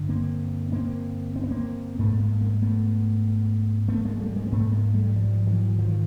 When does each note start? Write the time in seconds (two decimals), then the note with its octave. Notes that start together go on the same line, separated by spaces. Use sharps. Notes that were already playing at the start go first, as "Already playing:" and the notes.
Already playing: G2 D3
0.09 A#3 C4
0.72 A#3 C4
1.36 C4
1.43 B3
1.51 A#3 C4
1.99 G#2 A3 B3
2.20 G#3 A#3
2.41 G#3 A#3
2.62 A3 B3
3.88 A3 B3
4.05 G#3 A#3
4.20 G3 A3
4.36 G#3 A#3
4.47 C4
4.52 G#2 A3 B3
4.73 G#3 A#3
4.94 G3 A3
5.16 F3 G3
5.47 E3 F#3
5.79 D#3 F3